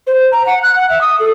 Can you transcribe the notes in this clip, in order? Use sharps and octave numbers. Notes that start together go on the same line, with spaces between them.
C5
A#5
F#5
F#6
F#5
E5
D#6
A4